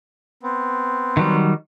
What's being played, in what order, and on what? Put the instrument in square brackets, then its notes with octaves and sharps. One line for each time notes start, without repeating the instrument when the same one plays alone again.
[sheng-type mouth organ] B3 C4
[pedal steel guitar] D#3 F#3 G3